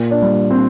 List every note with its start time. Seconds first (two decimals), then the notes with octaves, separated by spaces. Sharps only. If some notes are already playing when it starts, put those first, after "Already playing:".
Already playing: A#2
0.11 D4
0.22 G3
0.50 C4